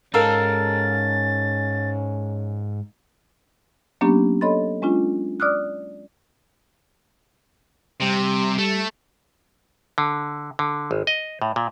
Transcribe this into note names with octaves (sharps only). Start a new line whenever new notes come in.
G#2 C#4 D#4 A4 A#4 F5 A6
F#3 A#3 B3 C#4 D4 G4
A4 C#5 D#5 B5 C6 A6
G#3 C#4 D4 F4
D5 D6 D#6 F6 F#6
C3 G3
A3
D3
D3
G#1
D#5
A2
A#2